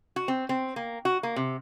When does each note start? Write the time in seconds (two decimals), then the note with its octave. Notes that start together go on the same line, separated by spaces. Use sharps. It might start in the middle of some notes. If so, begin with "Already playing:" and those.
0.16 F#4
0.28 C4
0.49 C4
0.76 A#3
1.05 F#4
1.23 A#3
1.36 C3